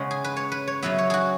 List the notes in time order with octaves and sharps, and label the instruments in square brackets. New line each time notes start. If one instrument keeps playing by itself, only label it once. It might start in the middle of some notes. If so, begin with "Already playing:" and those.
Already playing: [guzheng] C#3 G#3 B3
G#4
B4
C#5
B4
C#5
C#3 F#3 B3 E5
C#5
F#4 G#4